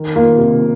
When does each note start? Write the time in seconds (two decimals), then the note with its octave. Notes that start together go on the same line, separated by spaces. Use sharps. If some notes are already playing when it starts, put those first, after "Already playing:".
Already playing: D#3
0.16 A#3 F4
0.38 C3